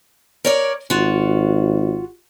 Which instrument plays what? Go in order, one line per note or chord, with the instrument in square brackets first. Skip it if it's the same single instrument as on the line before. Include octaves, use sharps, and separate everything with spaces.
[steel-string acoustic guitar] A#4 C#5 D5
[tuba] G#1 [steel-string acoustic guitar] F4 F#4